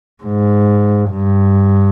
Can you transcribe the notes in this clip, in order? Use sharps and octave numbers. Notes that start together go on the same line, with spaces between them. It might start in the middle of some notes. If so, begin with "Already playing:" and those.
G#2
G2